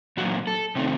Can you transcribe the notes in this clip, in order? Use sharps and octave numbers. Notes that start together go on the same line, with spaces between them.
A#2 F#3 A#3 F#4
A4
C3 D#3 A3 C4